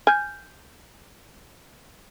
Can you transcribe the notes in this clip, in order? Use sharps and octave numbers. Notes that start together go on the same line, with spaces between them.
G#5 F6 G6